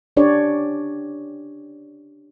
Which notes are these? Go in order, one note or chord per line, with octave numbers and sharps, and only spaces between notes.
C#4 D4 G4 C#5 D5